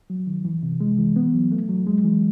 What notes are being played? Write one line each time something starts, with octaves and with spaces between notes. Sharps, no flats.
F#3
D#3
E3
C3
G#3
E3
B3
F#3
A3
F#3
G#3
E3